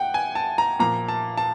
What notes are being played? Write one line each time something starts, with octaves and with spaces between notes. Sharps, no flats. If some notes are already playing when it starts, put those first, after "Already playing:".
Already playing: F#5 G5
G#5
A5
A#5
A#2 F3 A#3 A#5
A5
A5